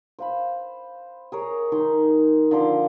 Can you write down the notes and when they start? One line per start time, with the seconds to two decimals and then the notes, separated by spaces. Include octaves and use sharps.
0.19 C5 F5 B5
1.32 G#4 A#4 C#5
1.72 D#3 D#4 G#4 C6
2.51 D3 F3 C6 D6